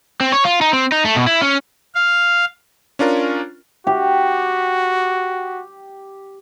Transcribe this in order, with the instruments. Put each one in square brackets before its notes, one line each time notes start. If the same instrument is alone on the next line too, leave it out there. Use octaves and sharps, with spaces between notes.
[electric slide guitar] C4
C#5
F4
D#4
C4
D#4
A3
B2
E4
C#4
[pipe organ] F5
[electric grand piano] C#4 D4 F4 A#4
[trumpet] F#4 [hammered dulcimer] G4